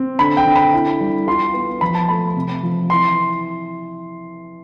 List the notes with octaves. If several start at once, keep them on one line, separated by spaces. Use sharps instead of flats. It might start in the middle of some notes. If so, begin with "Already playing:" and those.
Already playing: C4
D3 B5
G5
D3
B5
E4
G3
F4 C6
B3
F3 B5
A5
A3 B5
C3
F3
E3 C6